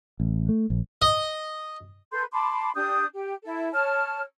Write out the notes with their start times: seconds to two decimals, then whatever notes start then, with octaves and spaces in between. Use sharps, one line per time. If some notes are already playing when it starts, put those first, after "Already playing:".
0.20 A1
0.49 A3
0.70 A#1
1.02 D#5
2.11 A4 B4 C6 G6
2.31 A5 B5 C6 D6
2.75 D4 G4 D#6 G6
3.14 G4
3.44 E4 A4
3.73 C#5 A5 F6